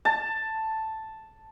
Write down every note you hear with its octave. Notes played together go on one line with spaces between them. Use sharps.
A5